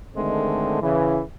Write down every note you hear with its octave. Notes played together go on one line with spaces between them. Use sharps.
D3 D#3 G#3 A3 C4
C#3 E3